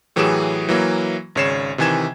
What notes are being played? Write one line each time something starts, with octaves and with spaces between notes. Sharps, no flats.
A2 E3 F#3 G4 G#4 E7
E3 F#3 A#3
G#1 C#3 C#5 C7 E7
C3 D#3 E3 G#5 G#6 E7